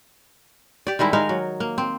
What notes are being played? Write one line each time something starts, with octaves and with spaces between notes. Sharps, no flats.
G4 D5
D#3 G3 G#3 E4
G#3 D#4 A#4 F5
F#3
A#3
C4